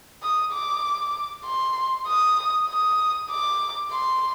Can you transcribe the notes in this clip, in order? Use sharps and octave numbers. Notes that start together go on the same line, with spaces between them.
D#6
D6
C6
D#6
D#6
D6
C6